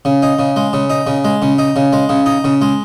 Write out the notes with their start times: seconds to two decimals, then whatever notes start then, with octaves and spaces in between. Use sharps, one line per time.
0.05 C#3
0.22 D#4
0.39 C#3
0.56 G#3
0.73 C#3
0.90 D#4
1.07 C#3
1.24 G#3
1.42 C#3
1.58 D#4
1.76 C#3
1.93 G#3
2.09 C#3
2.26 D#4
2.44 C#3
2.61 G#3